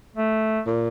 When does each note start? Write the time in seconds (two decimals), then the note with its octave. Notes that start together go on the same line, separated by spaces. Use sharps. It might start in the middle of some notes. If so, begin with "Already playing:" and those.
0.16 A3
0.66 A#2